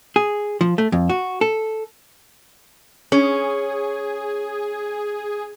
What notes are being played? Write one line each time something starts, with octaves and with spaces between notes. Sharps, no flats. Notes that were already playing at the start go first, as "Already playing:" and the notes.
G#4
F3
A3
F2
F#4
A4
C#4 G#4